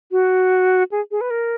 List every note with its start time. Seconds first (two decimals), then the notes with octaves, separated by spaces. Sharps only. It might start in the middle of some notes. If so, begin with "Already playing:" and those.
0.12 F#4
0.92 G#4
1.11 G#4
1.21 B4
1.30 A#4